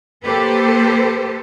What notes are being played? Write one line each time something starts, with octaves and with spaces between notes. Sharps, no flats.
A#3 G4 A4 B4 C5